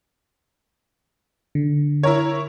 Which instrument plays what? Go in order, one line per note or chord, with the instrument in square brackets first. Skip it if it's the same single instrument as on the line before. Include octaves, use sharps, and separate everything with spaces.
[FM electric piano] D3
[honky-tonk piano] E4 A#4 C#5